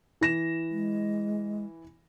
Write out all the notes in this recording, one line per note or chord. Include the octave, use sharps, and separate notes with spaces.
E3 A#6 E7
G#3